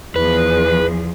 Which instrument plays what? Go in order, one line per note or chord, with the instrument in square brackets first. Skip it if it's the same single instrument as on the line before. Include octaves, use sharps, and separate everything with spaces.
[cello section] E2 F3 G#4 [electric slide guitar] B4